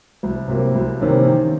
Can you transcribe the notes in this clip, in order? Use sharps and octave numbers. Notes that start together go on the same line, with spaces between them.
C2
C3 F#3 A#3
C2
C3 D#3 A#3 C#4
D#3